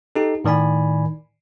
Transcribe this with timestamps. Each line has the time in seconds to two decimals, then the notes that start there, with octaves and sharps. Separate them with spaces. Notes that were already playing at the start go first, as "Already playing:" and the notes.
0.16 D#4 G4 A4
0.44 A2 D#3 D5 G#5 B5